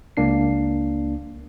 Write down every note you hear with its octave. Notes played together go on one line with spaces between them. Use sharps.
C#2 A#3 D4 C7